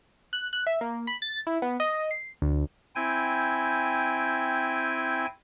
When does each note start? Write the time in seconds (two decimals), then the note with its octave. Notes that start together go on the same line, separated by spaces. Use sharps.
0.33 F#6
0.53 F#6
0.67 E5
0.81 A#3
1.07 B5
1.22 A6
1.47 E4
1.62 B3
1.80 D#5
2.11 C7
2.42 D2
2.96 C4 E4 G5 G#5